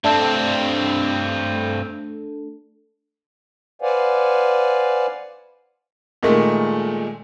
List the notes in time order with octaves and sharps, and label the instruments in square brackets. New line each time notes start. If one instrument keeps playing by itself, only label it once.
[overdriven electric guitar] G2 C4 [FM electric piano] A3 D4 A4
[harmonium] B4 C5 D5 F5 F#5 G#5
[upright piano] A#2 D#3 G#3 A3